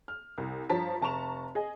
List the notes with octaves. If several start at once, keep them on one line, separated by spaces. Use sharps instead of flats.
F6
C2
G2 F3 C#5 A5 A#5 B6
F1 A5 A#5 C#6 E7 F7
G#4 D#5